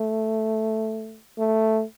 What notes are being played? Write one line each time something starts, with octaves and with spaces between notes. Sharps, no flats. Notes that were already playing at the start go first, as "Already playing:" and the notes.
Already playing: A3
A3